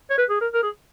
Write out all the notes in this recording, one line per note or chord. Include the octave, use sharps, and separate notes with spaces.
C#5
B4
G#4
A#4
A#4
G#4